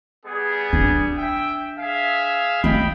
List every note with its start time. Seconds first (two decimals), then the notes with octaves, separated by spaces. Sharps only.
0.26 G3 B3 G#4
0.73 D4
1.17 E5 G5
1.79 G#4 E5 F5
2.64 A3 D#5 G5 B5